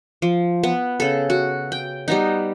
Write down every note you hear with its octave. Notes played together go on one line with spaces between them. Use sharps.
F3
B3
C#3 A4
F#4
G5
G3 B3 D#4